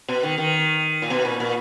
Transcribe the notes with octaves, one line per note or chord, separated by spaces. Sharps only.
B2
D#3
D#3
A#2
B2
A#2
A#2